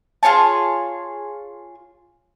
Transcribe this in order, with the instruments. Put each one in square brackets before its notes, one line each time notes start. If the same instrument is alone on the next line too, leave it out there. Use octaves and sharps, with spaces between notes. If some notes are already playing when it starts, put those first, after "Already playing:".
[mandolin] F4 G#4 C#5 A5